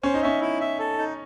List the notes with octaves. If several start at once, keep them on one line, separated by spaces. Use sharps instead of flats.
C#4 C5
D#4
C#4 E5
E4
E5
A4
D#4